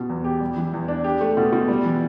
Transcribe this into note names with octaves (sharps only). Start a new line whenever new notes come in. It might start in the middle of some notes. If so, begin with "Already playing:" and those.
Already playing: B2 B3
E2
G4
G3
E3
E2
D4
G4
A3
B2
B2
G3
E3